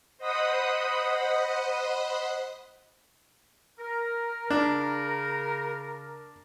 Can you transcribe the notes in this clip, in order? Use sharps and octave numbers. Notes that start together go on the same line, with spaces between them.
C5 D#5 F#5 B5 D#6
A#4
C#3 D4 A#4